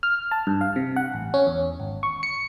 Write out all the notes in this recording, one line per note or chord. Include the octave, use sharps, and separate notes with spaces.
F6
A5
G2
F5
C3
F#5
A1
C#4
E2
G#1
C#6
C#7